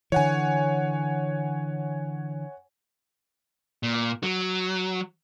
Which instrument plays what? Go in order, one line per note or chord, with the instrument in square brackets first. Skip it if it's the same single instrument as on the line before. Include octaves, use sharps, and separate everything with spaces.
[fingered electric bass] D3 E3 [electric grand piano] C#5 F#5 G#5
[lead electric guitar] A#2
F#3